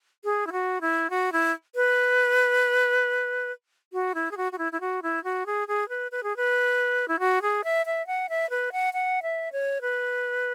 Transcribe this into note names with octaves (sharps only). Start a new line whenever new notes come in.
G#4
E4
F#4
E4
F#4
E4
B4
F#4
E4
G#4
F#4
F#4
E4
E4
F#4
E4
F#4
G#4
G#4
B4
B4
G#4
B4
E4
F#4
G#4
E5
E5
F#5
E5
B4
F#5
F#5
E5
C#5
B4